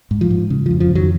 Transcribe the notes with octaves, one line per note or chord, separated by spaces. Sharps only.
G#2
F3
G#2
C#3
F2 F3
F3
F2 D#3 F#3